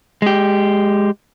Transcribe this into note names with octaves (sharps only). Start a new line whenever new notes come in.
G#3 G4